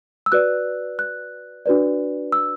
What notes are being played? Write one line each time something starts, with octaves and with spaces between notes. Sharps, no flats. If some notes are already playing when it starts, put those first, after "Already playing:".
E6
F#4 B4 D5 F#6
F#6
D4 F#4 B4 D5
E6